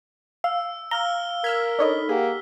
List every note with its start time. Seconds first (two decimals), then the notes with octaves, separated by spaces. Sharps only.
0.44 F5 E6
0.91 F5 A#5 E6 F6 G7
1.44 A#4 E6 F6 G#6 B6
1.79 D4 D#4 A4 C#5 D#5 B5
2.09 A#3 G4 G#4 F#5 G5